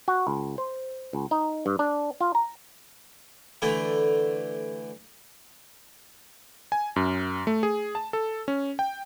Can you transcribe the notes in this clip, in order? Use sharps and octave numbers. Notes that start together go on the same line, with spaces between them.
F#4
C#2
C5
C#2
D#4
G2
D4
F4
A#5
D3 E3 A3 E4
G#5
F#2
A3
G#4
A5
A4
C#4
G5